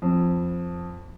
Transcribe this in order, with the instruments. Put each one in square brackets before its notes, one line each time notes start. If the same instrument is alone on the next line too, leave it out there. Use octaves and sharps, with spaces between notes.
[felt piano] F2